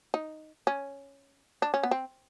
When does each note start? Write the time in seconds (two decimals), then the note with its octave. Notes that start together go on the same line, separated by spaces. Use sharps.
0.14 D#4
0.67 C#4
1.62 D4
1.74 C#4
1.83 B3
1.91 C4